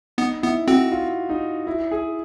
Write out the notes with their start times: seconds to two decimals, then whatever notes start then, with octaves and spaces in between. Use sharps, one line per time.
0.18 B3 D#4
0.43 B3 E4
0.68 C4 F#4
0.92 F4
1.29 D#4
1.67 E4
1.91 G#4